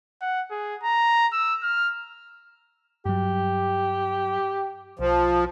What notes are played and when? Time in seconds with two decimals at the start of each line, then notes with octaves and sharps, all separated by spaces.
0.22 F#5
0.51 G#4
0.83 A#5
1.33 E6
1.63 F6
3.06 G2 F#3 G4
4.99 B1 F3